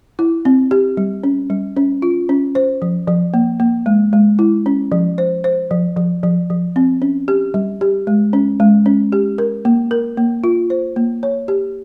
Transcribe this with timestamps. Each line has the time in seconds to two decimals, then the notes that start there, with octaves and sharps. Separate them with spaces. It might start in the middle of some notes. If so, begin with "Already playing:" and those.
0.19 E4
0.45 C4
0.71 G4
0.97 G3
1.24 C#4
1.50 G3
1.77 C#4
2.02 F4
2.29 C#4
2.55 C5
2.82 F3
3.08 F3
3.34 A#3
3.60 A#3
3.86 G#3
4.13 G#3
4.39 E4
4.66 C#4
4.92 F3
5.18 C5
5.44 C5
5.71 F3
5.97 F3
6.23 F3
6.50 F3
6.76 C4
7.02 C#4
7.28 G4
7.54 G3
7.81 G4
8.07 G#3
8.33 C#4
8.60 G#3
8.86 C#4
9.12 G4
9.38 A#4
9.65 A#3
9.91 A#4
10.17 A#3
10.44 F4
10.70 C5
10.96 A#3
11.23 C#5
11.48 G4